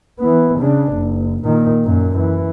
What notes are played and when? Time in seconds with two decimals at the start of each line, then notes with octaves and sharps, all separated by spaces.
0.19 E3 B3
0.58 C#3 D4
0.93 F#1
1.44 A#2 D#3
1.84 F#2 A#2
2.17 E3